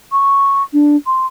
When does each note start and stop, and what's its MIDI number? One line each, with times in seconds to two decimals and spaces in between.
0.12 0.63 85
0.73 0.96 62
1.06 1.26 84